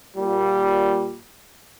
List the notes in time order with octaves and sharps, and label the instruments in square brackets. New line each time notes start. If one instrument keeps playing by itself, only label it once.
[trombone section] A#2 G3